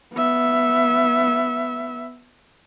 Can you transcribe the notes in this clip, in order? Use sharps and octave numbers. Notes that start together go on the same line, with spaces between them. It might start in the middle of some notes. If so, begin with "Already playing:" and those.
B3 E5